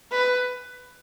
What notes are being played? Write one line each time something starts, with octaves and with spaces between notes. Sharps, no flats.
B4